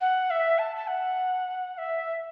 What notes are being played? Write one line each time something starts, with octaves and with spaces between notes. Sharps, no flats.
F#5
E5
A5
A5
F#5
F#5
E5